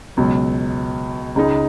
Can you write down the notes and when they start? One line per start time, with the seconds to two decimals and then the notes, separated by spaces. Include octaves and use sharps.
0.17 C#2 B2 F#3
1.36 C#2 C#3 G#3 D#4